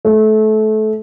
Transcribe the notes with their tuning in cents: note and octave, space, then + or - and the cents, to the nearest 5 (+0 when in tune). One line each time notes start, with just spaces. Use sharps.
A3 -25